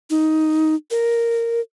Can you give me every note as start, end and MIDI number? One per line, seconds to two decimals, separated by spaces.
0.10 0.75 63
0.91 1.61 70